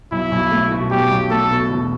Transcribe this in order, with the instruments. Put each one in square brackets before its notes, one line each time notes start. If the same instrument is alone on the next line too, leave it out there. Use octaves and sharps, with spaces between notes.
[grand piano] B1 [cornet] E4
[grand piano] B1
A3
B2
[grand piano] B1 [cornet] G4
[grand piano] B1
[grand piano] A3 [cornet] A4
[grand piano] B2
E1